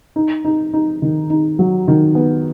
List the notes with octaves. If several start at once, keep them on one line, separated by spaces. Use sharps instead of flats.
D#4
D#4
D#4
D#3
D#4
F#3
D#3
B3